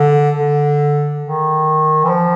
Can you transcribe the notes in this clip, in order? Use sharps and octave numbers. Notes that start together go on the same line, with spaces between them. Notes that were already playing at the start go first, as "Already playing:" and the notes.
Already playing: D3
D3
D#3
E3
F3